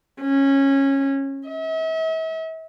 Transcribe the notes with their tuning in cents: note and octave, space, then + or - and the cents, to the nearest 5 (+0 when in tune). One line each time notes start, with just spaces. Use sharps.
C#4 -15
E5 -40